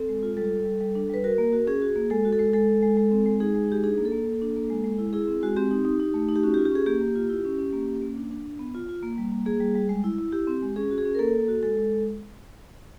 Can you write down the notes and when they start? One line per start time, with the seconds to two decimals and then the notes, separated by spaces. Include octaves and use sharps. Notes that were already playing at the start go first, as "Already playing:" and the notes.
Already playing: C4 A4
0.09 G#3
0.23 F4
0.37 G3 A4
0.52 G3
0.65 G3
0.81 G3
0.95 D4
1.09 G3 B4
1.24 F#4 A#4
1.38 A#3
1.53 F#4
1.67 C#4 G#4
1.82 F#4
1.96 A#3
2.10 G#3 A4
2.25 F#4
2.33 A4
2.39 G#3
2.53 G#3 A4
2.68 G#3
2.83 G#3
2.97 G#3
3.11 C4
3.26 G#3
3.40 D#4 G#4
3.54 G#3
3.69 D#4 G4
3.83 D4 G#4
3.98 A#3
4.05 A4
4.12 A#3
4.27 A#3
4.42 D4
4.56 A#3
4.70 G#3
4.84 G#3
4.99 E4
5.13 E4 G#4
5.28 C4
5.43 G#3 F#4
5.57 C4 G4
5.71 D#4
5.85 D#4
6.00 D#4
6.14 A3
6.29 D#4
6.36 G4
6.43 C#4 F#4
6.54 G4
6.57 F4
6.65 G4
6.72 C#4 G#4
6.86 A#3 G4
7.01 A#3
7.15 F4
7.29 E4
7.45 C#4
7.59 C#4
7.73 A#3
7.88 C#4
8.02 A#3
8.17 D4
8.31 D4
8.46 D4
8.59 B3
8.74 F4
8.89 F4
9.03 A#3
9.18 G3
9.32 A#3
9.46 A#3 G#4
9.60 G3
9.75 G3
9.89 G#3
10.04 E4
10.18 E4
10.32 E4 G4
10.47 C4
10.62 G#3
10.76 C#4 G#4
10.91 F#4
10.98 G#4
11.05 C#4
11.15 A#4
11.19 A#3 A4
11.34 A#3
11.48 F#4
11.63 G#3 A4
11.77 G#3